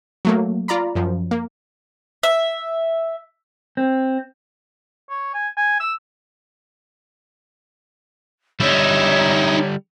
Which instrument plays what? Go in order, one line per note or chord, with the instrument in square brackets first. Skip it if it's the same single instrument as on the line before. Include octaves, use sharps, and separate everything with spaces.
[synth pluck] F#3 A3 A#3
F4 D5 A#5 B5
F#2 F3
A#3
[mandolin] E5
[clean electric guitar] C4
[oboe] C#5
G#5
G#5
E6
[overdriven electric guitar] D3 G3 [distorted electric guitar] D#4 E4 [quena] C#5